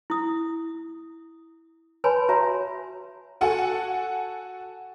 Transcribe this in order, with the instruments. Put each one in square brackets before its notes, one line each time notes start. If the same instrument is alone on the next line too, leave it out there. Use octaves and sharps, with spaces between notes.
[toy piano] E4 D#6
B4 C#5 G#5 A5 B5 C6
F#4 C#5 E5 A#5
[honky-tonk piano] F#4 A4 F#5 G#5